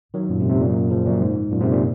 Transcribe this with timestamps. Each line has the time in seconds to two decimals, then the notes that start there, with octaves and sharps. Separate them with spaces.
0.14 D#3 F#3
0.29 F#2 A#2
0.40 G#2 C3
0.50 G#2 C3
0.60 F#2 A#2
0.90 C#3 F3
1.06 F#2 A#2
1.21 G#2
1.52 F#2 A#2
1.61 G#2 C3
1.72 A#2